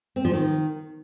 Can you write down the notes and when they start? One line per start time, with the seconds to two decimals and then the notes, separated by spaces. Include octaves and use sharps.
0.16 C4
0.25 F3
0.33 D#3